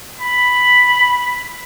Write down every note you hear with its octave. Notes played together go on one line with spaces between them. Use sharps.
B5